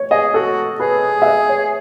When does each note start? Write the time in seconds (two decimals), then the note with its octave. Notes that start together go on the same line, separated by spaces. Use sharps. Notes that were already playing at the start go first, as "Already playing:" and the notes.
Already playing: C#5
0.11 G#4 D#5
0.34 F#4 A4
0.80 G#4 B4
1.22 E5
1.26 D#5
1.49 C#5